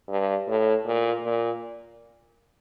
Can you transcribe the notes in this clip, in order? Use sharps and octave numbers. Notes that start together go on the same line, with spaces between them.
G2
A2
A#2
A#2